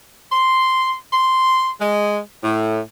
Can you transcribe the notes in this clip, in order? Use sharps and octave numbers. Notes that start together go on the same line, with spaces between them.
C6
C6
G#3
A2